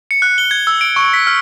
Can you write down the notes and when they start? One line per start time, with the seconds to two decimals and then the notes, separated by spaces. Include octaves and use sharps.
0.11 C#7
0.22 F#6
0.38 G7
0.51 G#6
0.67 E6
0.81 D7
0.96 C#6
1.13 B6
1.27 F6